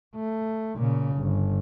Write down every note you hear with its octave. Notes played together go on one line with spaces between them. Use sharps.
A3
A#2 C#3
G1